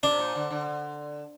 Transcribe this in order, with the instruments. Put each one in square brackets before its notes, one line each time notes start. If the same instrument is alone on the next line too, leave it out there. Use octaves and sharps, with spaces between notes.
[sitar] C3 [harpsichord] D4
[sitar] A#2
D3
D3